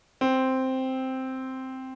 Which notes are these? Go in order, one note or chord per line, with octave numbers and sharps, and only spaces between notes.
C4